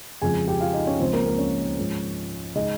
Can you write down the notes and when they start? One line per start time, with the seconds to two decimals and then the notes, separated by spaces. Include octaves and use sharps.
0.22 F2 C#3 F3 G#3 G#4 G#5
0.48 G4 G5
0.61 F4 F5
0.74 D#4 D#5
0.87 C#4 C#5
0.99 C#2 C#3 F3 G#3 C4 C5
1.13 A#3 A#4
1.25 A#3 A#4
1.38 C#4 C#5
1.77 G#2 F3 G#3
2.55 C#3 G#3 D#4 D#5